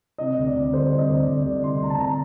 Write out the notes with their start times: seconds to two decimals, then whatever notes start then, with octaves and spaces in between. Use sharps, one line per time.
0.18 C3 D#5
0.37 D2
0.47 D5
0.56 D2
0.73 G3 C5
0.92 C3
0.98 D#5
1.09 D2 D5
1.27 D2 D5
1.46 G3 D5
1.64 C3 C6
1.81 D2 A#5
1.90 A5
1.99 A#5